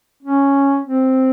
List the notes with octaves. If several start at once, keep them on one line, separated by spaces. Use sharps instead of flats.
C#4
C4